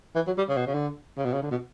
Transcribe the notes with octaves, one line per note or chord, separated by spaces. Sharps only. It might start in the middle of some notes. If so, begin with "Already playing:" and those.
E3
F#3
G3
C#3
B2
C#3
D3
C#3
B2
C#3
D3
B2